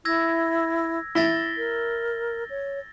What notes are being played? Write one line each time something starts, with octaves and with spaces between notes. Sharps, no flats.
E4 E6 G#6 A#6
E4 A6 A#6 G7
A#4
C#5